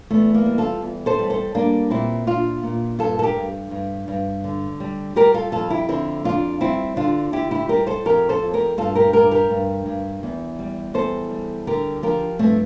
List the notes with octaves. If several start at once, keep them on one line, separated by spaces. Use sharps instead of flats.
E2 A3
A#3
G3
F4 A4
E2
A4 C5
G3
A4 C5
G3 A#3 D4
A#2 C4 E4
A#2 D4 F4
A#2
G2 F4 A4
A4
G4 A#4
G2
G2
G2
D3
G3
G3 G4 A#4
F4 A4
F2 F4 A4
E4 G4
D3 C4 E4
F2 D4 F4
G3 C4 E4
D3 D4 F4
D3 E4 G4
E4 G4
G3 G4 A#4
A4 C5
F2 G4 A#4
A4 C5
F2
G4 A#4
G2 F4 A4
G4 A#4
G2 G4 A#4
G4 A#4
G2
G2
E2
G3
E2 A4 C5
G3
D3 G4 A#4
F3 G4 A#4
G2 A3 C4